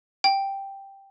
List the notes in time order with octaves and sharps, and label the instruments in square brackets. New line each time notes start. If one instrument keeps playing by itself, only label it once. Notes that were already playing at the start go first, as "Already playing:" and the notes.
[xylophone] G5